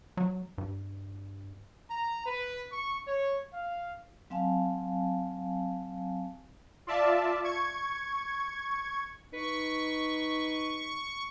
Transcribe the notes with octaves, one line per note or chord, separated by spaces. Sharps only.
F#3
G2
A#5
B4
C#6
C#5
F5
F#3 C4 F5 G#5 A5
F4 D5 E5 A5
C#6 G#6
D#4 B4 C#6